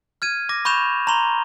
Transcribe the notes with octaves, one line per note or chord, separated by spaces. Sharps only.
F6 G#6 D#7
D6 A#6
B5 C#6 G6 E7 F7
A#5 C6 F7 G7